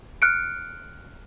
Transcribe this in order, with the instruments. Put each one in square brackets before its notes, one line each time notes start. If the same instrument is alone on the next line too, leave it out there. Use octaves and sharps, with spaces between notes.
[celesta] F6 F#6 C#7 D7